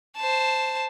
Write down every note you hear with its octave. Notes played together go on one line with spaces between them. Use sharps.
C5 A5